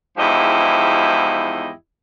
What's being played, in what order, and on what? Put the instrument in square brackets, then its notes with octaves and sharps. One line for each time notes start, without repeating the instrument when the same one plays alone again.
[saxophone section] E2 G#2 F3 E4 G4 D#5